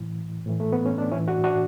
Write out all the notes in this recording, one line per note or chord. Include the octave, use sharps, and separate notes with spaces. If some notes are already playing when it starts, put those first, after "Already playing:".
Already playing: A2 E3
A2 E3
A3
B3
C#4
D4
A2 E3 C#4 E4
D4 F#4
D4 F#4